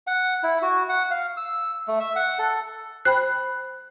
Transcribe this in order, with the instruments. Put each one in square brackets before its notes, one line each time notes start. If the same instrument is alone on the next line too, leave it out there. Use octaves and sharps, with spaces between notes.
[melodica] F#5
E4
F#4
F#5
F5
E6
A3
E5
F#5
A4
[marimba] C5 G5 B5 [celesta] F#6